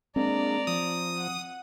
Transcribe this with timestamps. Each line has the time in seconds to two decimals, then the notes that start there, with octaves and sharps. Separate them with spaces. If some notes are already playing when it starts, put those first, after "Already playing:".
0.16 G#3 A#3 C4 D4 D5 A#5
0.67 F3 D#6
1.16 F#5